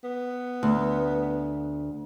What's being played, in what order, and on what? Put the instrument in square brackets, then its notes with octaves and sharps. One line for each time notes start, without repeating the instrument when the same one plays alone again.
[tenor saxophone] B3
[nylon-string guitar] D2